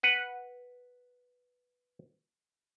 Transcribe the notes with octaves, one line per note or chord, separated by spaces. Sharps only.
B4 F#5